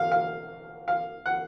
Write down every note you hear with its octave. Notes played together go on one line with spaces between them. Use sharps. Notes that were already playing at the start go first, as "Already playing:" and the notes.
Already playing: F5
F5
F5
F#5